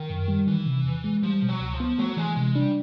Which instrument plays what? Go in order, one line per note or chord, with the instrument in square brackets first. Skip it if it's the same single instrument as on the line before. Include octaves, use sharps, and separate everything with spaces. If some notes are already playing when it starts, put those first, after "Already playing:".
Already playing: [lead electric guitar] D#3
[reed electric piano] F#2
G3
[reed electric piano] D#3 [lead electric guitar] E3
[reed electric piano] C3
E2
G#3
[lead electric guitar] F3 [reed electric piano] G3
[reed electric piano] B2
[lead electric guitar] F#3
[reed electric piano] C#2
[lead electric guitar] F3
[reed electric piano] B3
[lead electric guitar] F#3 [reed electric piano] A3
[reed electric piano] E3 [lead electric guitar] G#3
[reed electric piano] C3 [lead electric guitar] G#3
[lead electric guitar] G3 [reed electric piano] D4